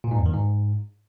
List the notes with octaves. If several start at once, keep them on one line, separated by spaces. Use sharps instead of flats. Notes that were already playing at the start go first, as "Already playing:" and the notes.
A#2
G#2
E2
D#3
G#2